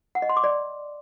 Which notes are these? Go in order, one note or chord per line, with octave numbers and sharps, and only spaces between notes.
F#5
D#5
C6
D6
D5